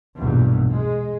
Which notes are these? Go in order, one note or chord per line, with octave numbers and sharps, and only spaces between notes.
B1 E2 G2 A#2 G3
G#3